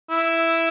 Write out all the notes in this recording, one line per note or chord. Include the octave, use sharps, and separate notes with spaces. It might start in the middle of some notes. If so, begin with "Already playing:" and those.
E4